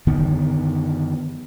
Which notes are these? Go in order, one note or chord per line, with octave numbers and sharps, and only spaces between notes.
F#2 D3 D#3 B3